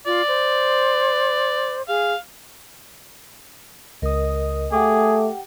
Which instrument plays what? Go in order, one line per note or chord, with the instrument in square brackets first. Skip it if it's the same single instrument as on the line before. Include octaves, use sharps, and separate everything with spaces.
[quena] F4 [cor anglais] D5
[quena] C5
[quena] G#4 [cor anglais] F5
[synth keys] C#2 D#6 [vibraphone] A#4 D#5
[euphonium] A3 [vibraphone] G4 F#5 G5 [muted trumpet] G#4 [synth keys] D6